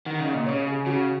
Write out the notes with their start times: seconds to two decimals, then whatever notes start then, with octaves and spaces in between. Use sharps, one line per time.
0.06 D#3 F#5
0.20 C#3
0.26 D#5
0.34 A#2
0.46 C#3 C#5
0.67 G#4
0.86 C#3 F#4